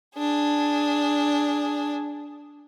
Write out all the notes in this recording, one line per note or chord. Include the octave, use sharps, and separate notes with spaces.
D4 G#4